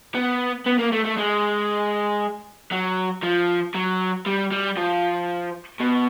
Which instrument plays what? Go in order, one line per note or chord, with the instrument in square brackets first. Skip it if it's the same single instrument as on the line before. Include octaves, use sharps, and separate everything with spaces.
[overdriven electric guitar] B3
B3
A#3
A3
A3
G#3
F#3
F3
F#3
G3
G3
F3
B2